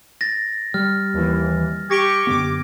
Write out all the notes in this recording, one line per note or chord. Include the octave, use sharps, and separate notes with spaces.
A6 A#6
G3 F6
D#2 E3
G4 C#6 G#6 A#6 D7
F#2 D3 B3 D6